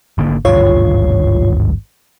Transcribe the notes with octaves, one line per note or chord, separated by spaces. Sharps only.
G#1 D3 A#3
G#1 D2 G2 F4 C#5